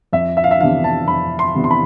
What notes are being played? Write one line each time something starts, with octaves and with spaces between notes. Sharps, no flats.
F2 E5
E5
F5
E5
C3 E3 B3 D4 F5
A5
F2 B5
C6
C3 E3 B3 D4
C6
B5